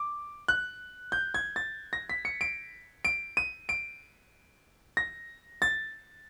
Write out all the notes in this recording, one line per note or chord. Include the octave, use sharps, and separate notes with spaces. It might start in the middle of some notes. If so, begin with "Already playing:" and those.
Already playing: D6
F#6
G6
G#6
A6
A#6
B6
C#7
D7
D7
D#7
D7
A#6
A6